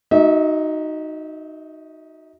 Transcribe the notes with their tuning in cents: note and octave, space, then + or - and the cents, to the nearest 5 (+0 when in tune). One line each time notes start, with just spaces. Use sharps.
D#4 +0 F#4 +0 E5 -35